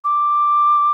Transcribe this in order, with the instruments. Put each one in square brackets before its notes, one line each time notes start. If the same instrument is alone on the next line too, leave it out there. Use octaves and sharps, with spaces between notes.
[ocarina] D6